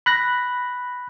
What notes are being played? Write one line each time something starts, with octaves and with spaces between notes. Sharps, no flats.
B5 F#6 A#6